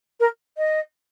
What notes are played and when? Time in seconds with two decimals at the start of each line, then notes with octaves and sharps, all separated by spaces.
0.20 A#4
0.57 D#5